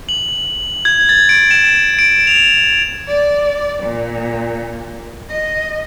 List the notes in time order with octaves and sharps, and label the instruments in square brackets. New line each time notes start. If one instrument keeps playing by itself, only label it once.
[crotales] F#7
G#6
A6
D7
E7
D7
F7
[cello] D5
A#2
D#5